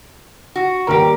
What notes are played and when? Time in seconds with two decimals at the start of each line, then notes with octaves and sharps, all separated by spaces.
0.56 F#4
0.87 D#2 G3 G4 A#4 A#5